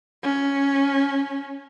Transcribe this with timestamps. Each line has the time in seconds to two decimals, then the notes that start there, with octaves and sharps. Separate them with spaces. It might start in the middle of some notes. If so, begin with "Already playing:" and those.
0.23 C#4